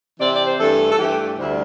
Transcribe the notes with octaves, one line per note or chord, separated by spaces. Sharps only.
C3 E3 C4 D5
D5
C5
G2 E3 A3 A4
A4
G2 E3 A3 G4
D2 C3 G3 D4 E4